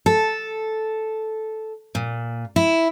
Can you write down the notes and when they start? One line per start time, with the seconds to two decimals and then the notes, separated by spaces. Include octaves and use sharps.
0.06 A4
1.95 A#2
2.56 E4